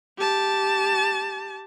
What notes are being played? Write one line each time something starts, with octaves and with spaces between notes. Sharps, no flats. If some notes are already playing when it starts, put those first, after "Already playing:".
G4 A5